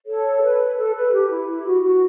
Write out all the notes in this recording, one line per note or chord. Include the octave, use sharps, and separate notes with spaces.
A4 C#5
B4
A4
B4
G4
E4
E4
F#4
F#4